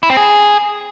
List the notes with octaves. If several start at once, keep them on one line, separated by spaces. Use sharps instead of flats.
E4
C4
G#4